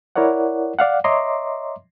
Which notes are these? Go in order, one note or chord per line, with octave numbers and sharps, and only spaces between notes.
E4 A#4 C#5 D5 F#5
D5 F5 F#5
C#5 D#5 E5 A#5 C6 D6